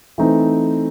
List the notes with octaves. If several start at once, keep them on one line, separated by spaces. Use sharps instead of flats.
E3 A3 C4 D#4